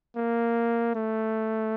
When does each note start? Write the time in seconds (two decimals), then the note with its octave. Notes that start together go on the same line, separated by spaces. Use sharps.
0.17 A#3
0.95 A3